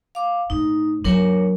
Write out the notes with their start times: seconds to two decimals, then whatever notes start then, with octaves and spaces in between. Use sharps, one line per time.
0.15 F5 D6
0.50 A2 D#4
1.04 F#3 A#3 D4 A#4 C#5